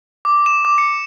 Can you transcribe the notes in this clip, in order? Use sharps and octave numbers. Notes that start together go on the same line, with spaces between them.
D6
E7
D6
C#7